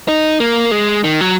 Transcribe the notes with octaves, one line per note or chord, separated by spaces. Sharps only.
D#4
A#3
G#3
D#3
F#3